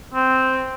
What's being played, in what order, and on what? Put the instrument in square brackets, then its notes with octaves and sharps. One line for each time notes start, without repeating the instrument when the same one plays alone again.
[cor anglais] C4